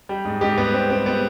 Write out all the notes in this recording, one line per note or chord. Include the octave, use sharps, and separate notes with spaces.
G3
G#2
G#2 G4
G3 B3
G3 C4
G3 C4
G3 B3